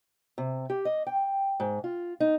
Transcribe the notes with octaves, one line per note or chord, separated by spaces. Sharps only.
C3
G4
D#5
G5
G#2
F4
D#4